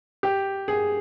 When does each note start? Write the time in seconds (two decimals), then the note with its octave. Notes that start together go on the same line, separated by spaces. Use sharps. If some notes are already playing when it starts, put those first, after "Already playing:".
0.23 G4
0.68 G#4